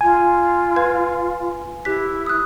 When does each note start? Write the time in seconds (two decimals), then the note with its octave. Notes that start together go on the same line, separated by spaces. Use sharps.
0.01 F4 G#5
0.76 B4 F5 G#6
1.85 E4 G4 F#6 B6
2.26 D#6 F#6